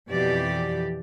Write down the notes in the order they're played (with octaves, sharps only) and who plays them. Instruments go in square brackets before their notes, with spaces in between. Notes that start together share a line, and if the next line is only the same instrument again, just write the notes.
[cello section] F2 B2 E3 G4 D5